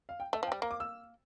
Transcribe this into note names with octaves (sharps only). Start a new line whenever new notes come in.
F5
G5
A3 E5
F3
G5
G3
A#3 A#5
D6
E6